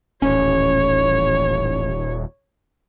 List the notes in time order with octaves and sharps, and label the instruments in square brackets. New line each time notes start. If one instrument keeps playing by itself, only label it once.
[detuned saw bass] D#1 [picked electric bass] A1 C#4 [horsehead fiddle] C#5